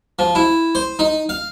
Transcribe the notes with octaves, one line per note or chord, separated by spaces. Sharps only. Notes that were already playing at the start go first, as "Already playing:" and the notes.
F3
E4
C5
D#4
F5